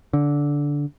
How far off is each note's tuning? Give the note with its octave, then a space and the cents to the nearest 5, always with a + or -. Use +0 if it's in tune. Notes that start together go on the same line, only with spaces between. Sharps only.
D3 -15